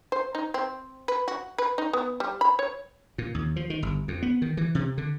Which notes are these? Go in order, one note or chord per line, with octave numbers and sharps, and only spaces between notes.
C5
D#4
C4
B4
F#4
B4
D#4
B3
G3
B5
C#5
A#2
D#2
F3
D#3
G1
F2
B3
D#3
E3
C3
D3